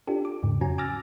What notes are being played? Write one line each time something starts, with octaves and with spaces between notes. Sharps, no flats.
D4 F4 G4 A4
D6
E2 G#2 C#3
F2 F#3 C#4 F#4 G#5 A#5
G#5 D6 E6 F6 A6 A#6